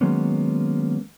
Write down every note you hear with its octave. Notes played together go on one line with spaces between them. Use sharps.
D#3 F#3 G#3 A#3 B3 C#4